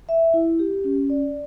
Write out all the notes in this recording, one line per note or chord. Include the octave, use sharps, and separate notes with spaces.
E5
E4
G4
C#4
D5